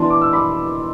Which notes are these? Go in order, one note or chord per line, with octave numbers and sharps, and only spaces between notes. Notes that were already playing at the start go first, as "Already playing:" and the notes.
Already playing: E3 B3 D4 A5 C6
D6
E6
B5 D6